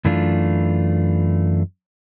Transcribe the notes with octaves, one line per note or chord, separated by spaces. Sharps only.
F#2 E3 A3 D4 F4